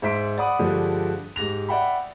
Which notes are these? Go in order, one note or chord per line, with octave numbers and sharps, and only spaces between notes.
G#2 C5 E5 C6 B6 D7
D5 F#5 B5 D#6
G2 D3 F3 G3 G#3
G#2 G4 A#6 F7
D5 E5 F#5 G5 B5